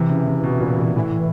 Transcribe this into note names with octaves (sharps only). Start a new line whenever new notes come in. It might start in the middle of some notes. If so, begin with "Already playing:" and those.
Already playing: C3 E3
C#3
C3
B2
A#2
A#2
A2 E3